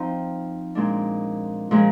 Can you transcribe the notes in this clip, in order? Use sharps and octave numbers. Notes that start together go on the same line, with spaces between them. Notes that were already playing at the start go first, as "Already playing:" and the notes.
Already playing: F3 C4 D#4
A#2 G#3 D4
A#2 F3 G#3